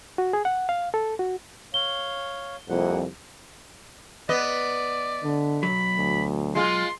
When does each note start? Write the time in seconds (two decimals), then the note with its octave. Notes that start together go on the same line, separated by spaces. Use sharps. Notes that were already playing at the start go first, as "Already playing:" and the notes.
0.18 F#4
0.33 G#4
0.45 F#5
0.69 F5
0.94 A4
1.19 F#4
1.74 C#5 F5 G7
2.69 C2 F2 C3 A#3 F#5
4.29 B3 D5 D#5
5.24 D3
5.63 B1 F#3 B5
5.97 D2
6.55 G#3 F4 C6